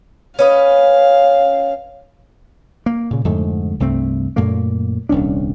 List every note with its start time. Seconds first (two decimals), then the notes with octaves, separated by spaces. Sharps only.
0.39 C#4 B4 D#5 F5
2.86 A#3
3.11 A#2 C#3
3.24 F2 G#2 D3 A3
3.80 C2 G2 A3 C4
4.36 F#2 A#2 A3 A#3
5.09 D#1 C2 C#4 D4